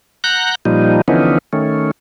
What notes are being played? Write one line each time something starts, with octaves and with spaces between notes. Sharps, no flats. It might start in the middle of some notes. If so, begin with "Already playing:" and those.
F#5 A#5 F#6 G6
A#2 F3 G3 D#4
D3 E3 F3 B3 C#4 D#4
D#3 A3 C#4